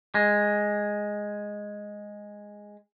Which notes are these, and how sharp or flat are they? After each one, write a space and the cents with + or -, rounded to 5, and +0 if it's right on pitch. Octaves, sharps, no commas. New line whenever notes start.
G#3 -5